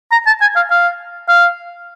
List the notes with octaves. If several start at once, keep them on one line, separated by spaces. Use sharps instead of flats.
A#5
A5
G#5
F5
F5
F5